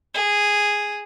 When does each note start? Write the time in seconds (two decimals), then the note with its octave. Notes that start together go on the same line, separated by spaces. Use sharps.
0.14 G#4